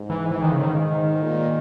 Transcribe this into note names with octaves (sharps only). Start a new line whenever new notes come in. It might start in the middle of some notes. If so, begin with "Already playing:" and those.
Already playing: G#2
E3
E3
D#3
C#3
D#3
A#2